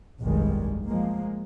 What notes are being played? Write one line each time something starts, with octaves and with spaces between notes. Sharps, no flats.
F1 B1 G2 D#3 G3 G#3
F3 G#3 A#3